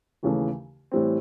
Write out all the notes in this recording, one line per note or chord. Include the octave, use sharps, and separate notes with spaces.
D#2 C#3 E3 A3
A2 E3 G3 C4